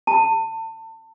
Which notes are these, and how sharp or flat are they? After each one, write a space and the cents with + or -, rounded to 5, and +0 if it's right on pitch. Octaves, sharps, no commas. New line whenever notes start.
A5 +30